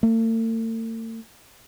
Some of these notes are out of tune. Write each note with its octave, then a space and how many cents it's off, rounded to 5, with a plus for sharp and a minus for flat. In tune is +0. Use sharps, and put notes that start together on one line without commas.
A3 +45